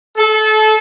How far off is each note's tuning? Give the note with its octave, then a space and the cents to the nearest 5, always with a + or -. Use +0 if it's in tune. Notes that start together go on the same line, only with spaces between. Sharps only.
A4 -25